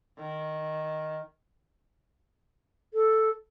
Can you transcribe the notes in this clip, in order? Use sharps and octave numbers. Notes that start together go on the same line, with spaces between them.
D#3
A4